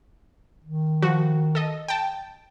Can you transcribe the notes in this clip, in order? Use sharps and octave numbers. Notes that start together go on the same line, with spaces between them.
D#3
F3 F#4
A4 D#5
G5 A5